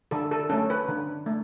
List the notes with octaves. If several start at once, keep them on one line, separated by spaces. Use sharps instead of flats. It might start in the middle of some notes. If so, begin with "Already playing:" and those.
D3 A4
A4
A3 C#4 A4
B4
D3
A3